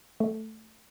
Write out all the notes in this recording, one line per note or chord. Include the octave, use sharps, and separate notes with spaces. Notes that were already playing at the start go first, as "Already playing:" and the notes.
A3